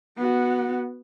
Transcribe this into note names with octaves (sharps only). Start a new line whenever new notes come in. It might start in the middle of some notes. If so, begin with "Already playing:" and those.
B3 F#4